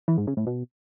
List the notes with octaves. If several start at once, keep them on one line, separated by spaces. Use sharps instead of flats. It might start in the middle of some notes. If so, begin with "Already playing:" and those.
E3
G#2
C#3
A2
B2